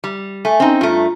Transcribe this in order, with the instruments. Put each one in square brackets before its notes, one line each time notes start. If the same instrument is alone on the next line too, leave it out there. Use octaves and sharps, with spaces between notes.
[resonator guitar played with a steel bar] G3
[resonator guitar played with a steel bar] A3 [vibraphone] G#5
[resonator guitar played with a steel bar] C4 D#4 [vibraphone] C#4
[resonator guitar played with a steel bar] G2 A3 [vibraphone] F4 A#5